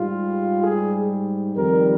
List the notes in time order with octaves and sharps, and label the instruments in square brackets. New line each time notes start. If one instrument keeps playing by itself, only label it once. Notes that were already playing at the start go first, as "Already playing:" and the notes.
Already playing: [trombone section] G#2 G3 F4
G#4
F2 D#3 G3 A#4